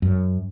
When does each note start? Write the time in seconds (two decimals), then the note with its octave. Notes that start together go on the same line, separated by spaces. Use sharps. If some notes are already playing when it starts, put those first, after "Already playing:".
0.02 F#2